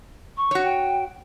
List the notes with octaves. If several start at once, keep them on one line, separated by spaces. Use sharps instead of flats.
C#6
F#4 C#5
G5